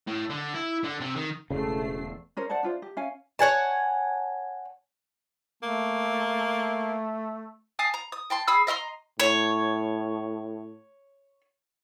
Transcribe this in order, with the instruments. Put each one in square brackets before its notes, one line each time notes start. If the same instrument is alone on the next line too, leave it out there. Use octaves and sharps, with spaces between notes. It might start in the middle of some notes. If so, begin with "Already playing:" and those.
[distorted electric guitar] A2
D3
E4
D3
C3
D#3
[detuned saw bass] E1 [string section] E2 A3 C7 [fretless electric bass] C#3
[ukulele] C#4 A#4 C5
C5 D5 F#5 A5
D4 F4 C5
G4
C#4 F5 G#5
[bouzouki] C#5 F#5 G#5 A5
[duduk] A3 [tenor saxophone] A#3
[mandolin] F5 G#5 A5 D#6
A#5
D#6
G5 A5 C6
G#4 B5 D#6 E6
D#5 E5 A#5 C6
[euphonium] A2 [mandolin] C#5